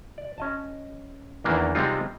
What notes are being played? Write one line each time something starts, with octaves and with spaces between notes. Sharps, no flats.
D5
C#4 D#5 A5
E2 D#3 E3 A#3 D4
C3 G3 G#3 C4 D#4 F4